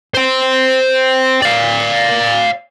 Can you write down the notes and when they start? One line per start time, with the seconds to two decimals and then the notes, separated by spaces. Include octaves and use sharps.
0.14 C5 G5
1.42 D5 F5